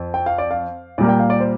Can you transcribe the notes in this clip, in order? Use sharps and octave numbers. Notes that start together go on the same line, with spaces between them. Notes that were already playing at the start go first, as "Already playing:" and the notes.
Already playing: F2
G5
F5
D5
F5
A#2 G3 A#3 D5
G5
F5
D5
C5